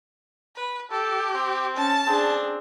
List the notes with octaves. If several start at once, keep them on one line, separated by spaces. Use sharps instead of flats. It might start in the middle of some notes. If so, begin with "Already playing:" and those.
B4
G4 A4
C4
C#4 A5
C4 D4 G#4